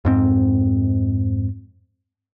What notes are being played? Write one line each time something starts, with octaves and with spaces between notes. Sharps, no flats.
F2 G#2 C4